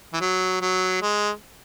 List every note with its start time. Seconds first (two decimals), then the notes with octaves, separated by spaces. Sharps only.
0.13 E3
0.21 F#3
0.62 F#3
1.02 G#3